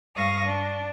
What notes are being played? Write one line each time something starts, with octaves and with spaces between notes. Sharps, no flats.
G2 F5 C#6 D#6 A#6
D4